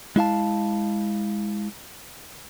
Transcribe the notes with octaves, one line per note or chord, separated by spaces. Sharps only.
G#3 E4 F5 A5